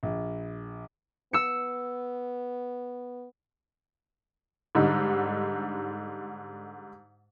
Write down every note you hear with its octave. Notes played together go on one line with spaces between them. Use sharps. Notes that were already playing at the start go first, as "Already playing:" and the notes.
A#1
B3 E6 C#7
G#2 D3 G3 D#4